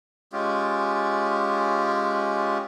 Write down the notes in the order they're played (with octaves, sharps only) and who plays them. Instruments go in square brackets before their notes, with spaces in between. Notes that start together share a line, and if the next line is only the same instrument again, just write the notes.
[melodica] G#3 C#4 F4 G4